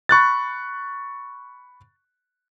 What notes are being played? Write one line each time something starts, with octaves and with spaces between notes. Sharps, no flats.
B5 C#6 F#6 A6